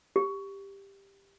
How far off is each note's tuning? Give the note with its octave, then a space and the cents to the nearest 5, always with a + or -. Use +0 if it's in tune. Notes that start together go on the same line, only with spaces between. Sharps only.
G4 +10